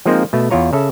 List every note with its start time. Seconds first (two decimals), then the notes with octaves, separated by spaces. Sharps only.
0.06 F3 G#3 A#3 C4 D#4 C5
0.33 B2 A3
0.51 E2 E4 F4 C#5 A#5
0.73 C#3 A4 E5